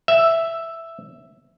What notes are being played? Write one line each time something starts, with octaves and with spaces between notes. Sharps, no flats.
E5